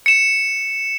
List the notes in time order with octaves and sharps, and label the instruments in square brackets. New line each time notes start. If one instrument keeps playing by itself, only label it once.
[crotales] C#7 E7